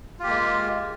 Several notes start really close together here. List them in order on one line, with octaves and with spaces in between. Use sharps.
F4 G4 A#3 G#3